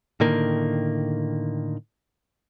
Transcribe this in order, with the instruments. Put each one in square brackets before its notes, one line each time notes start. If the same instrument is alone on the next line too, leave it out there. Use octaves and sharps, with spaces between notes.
[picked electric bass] A2 D3 D#3 A#3